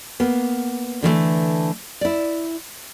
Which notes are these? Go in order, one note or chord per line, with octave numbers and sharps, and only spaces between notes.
A#3 B3
D3 E3 F#3 A3
E4 D5